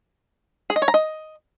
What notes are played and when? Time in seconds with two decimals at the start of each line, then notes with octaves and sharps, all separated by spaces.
0.70 G#4
0.76 D#5
0.82 C#5
0.88 A#5
0.94 D#5